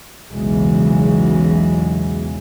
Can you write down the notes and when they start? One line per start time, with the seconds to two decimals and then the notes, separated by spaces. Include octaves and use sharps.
0.32 B1 E2 C#3 E3 F#3 G#3